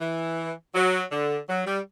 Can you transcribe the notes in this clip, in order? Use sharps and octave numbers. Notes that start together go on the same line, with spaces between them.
E3
F#3
D3
F#3
G3